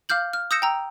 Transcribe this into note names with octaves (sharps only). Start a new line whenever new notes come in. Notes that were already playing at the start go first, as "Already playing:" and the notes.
F5 D6 F6 G6 F#7
F6
D#6 E6 G6 A#6 C#7 E7
G5 A#5 E6